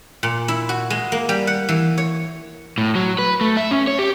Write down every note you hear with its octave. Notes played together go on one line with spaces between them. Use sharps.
A#2
E4
F#4
G#3
A#3
G3
F#5
E3
C#5
A2
F#3
B4
A3
E5
C#4
C#5
G4